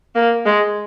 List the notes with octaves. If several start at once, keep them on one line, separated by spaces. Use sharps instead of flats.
A#3
G#3